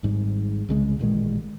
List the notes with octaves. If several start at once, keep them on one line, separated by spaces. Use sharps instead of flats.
G#1 G#2 G3
C2 C#3 G#3
A1 A#2 D#3 G#3